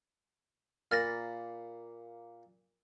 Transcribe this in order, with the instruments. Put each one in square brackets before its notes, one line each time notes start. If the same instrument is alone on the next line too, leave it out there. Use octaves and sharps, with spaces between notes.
[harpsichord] A#2 A#3 B5 [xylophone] F6 A6 A#6